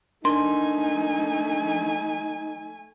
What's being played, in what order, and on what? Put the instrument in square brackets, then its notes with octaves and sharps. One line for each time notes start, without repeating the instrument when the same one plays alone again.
[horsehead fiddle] A3 G#5 [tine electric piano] D4 A#4 [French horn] D#4 [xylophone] C6